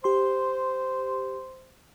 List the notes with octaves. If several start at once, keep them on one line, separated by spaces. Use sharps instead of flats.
G4 C5 C6